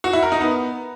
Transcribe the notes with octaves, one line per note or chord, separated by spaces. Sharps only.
F#4
E4
A#4
D#4
B3